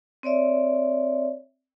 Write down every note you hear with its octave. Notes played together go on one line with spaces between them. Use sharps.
C4 C#5 D5 E5